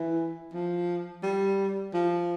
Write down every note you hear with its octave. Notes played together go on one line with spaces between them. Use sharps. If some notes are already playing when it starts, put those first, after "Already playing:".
Already playing: E3
F3
G3
F3